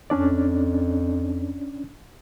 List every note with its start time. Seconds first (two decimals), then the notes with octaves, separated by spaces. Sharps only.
0.10 F2 C#4 D4 D5